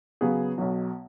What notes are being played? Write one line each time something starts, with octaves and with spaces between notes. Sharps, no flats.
C#3 F#3 B3 G#4
B1 B2 F#3